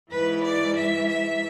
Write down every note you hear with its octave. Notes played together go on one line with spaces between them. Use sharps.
G#2 E3 B4
D5
E5
E5